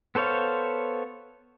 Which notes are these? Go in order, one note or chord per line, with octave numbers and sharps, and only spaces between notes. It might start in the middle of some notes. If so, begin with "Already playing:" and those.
B3 A4 C5 C#5 F5